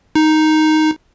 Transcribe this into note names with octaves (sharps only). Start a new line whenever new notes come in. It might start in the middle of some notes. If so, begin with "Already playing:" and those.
D#4